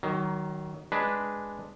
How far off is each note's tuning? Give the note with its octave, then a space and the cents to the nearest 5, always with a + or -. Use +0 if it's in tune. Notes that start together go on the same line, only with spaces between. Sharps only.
D#3 +0 F#3 +25
G#3 +0 D4 +0 B4 +0